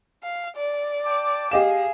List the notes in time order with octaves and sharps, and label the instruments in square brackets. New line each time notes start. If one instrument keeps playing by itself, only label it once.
[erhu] F5
D5
[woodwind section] G5 A5 D6
[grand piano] G4 D#5 E7 [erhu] G#4 [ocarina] F5